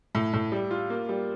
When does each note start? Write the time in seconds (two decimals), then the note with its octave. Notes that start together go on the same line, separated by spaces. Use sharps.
0.15 A2
0.33 A2
0.52 G3
0.71 F4
0.90 A#3
1.09 G3